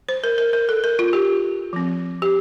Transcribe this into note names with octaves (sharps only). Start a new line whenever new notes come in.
C5
A#4
A#4
A#4
A4
A#4
F4
G4
F3 C4
G4